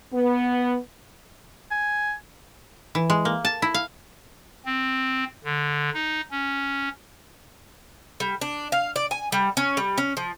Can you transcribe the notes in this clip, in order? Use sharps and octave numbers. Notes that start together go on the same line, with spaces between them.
B3
G#5
E3
G#3
A#3
A5
E4
F5
C4
D3
D#4
C#4
G3
D4
F5
D5
G#5
G3
C#4
G3
C#4
F3